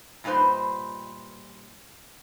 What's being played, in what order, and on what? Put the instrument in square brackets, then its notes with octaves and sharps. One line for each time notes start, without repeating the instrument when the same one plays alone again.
[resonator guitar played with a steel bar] G2 A#2 D#4 B4 C5